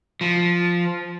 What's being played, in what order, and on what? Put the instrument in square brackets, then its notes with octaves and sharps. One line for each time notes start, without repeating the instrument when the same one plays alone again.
[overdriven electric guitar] F3